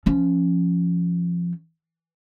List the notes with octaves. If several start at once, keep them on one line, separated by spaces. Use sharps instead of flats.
F3 C#4